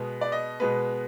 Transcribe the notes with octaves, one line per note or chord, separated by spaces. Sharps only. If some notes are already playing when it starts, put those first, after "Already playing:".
Already playing: B2 G#3 B3
D5
D#5
B2 G#3 B3 B4